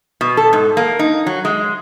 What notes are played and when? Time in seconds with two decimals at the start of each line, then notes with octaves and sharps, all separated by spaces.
0.21 B2
0.37 A4
0.53 G#2
0.77 A#3
0.99 D#4
1.27 F#3
1.45 G#3